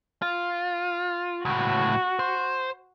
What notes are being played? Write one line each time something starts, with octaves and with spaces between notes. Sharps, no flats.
F4
C#2 A2 F#4
C5